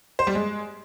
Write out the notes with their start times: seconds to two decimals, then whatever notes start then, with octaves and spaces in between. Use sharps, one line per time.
0.19 C5
0.27 G3
0.35 G#3